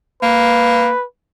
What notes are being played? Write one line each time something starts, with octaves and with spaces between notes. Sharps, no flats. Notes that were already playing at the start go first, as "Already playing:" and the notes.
A#3 B4